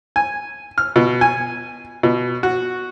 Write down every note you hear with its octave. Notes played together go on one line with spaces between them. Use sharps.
G#5
F6
B2
G#5
B2
F#4